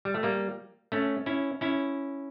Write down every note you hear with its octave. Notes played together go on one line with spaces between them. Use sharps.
G3
A3
G3 A#3
A3 C#4
C#4 E4
C#4 E4